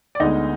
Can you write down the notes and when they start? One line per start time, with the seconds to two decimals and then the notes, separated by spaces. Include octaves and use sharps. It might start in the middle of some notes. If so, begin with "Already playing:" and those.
0.15 D5
0.20 D2 D3 G#3 B3 D#4 D#5